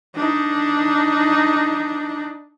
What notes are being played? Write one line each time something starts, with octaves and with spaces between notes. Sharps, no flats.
D4 D#4